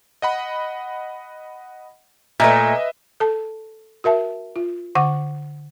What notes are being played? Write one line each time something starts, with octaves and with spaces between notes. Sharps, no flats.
D#5 F#5 B5
A#2 A3 B4 D#5 E5
A4 A5
F#4 A#4 E5 A5
F4
D3 F#5 D6